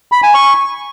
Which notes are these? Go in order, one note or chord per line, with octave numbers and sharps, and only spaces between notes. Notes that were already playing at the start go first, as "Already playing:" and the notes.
B5
G#5
C#6